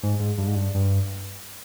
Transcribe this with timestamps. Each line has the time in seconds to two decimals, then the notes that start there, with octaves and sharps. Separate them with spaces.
0.03 G#2
0.20 G#2
0.38 G2
0.47 G#2
0.55 G2
0.74 G2